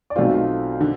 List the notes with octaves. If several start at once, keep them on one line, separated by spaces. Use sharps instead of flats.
D5
B1 B2 A3 C4 F4 C5
D3